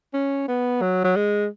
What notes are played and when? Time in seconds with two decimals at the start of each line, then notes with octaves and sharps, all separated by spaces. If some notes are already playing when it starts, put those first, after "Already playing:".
0.14 C#4
0.48 B3
0.82 F#3
1.04 F#3
1.16 G#3